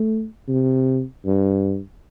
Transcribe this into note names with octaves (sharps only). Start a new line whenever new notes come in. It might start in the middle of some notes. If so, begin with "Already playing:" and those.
Already playing: A3
C3
G2